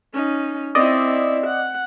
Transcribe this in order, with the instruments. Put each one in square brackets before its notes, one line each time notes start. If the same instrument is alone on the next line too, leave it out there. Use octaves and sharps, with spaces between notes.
[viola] C#4 D#4
[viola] C4 E4 [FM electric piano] D5 D#5
[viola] F#5